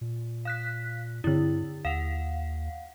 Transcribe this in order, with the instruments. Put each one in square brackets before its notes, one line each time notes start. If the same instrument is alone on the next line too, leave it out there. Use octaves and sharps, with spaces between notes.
[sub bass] A#2
[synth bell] F5 F#6 B6
[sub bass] G2 [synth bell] D3 E4
[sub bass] D#2 [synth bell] F5 F#5